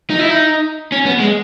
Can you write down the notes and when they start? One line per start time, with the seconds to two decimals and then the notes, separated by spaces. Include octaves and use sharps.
0.10 D#4
0.19 E4
0.30 D#4
0.92 C#4
1.06 B3
1.20 G#3